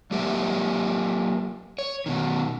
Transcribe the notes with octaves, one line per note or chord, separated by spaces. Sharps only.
F#3 A#3 G4 A#4 E5
C#5
B2 D#3